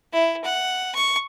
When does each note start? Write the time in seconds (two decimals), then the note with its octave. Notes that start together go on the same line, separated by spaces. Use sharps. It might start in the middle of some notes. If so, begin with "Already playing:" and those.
0.13 E4
0.44 F#5
0.95 C#6